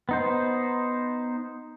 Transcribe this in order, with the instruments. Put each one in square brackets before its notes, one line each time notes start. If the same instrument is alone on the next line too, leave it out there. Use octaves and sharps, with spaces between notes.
[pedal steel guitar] B3 D#4 C5